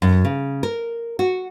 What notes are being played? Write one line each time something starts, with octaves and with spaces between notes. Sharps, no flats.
F#2
C#3
A#4
F#4